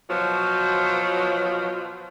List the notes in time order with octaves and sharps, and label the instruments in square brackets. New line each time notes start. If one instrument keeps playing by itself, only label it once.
[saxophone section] B2 F3 F#3 F4